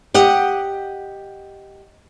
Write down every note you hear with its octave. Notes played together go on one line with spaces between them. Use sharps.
G4 D#5 F#5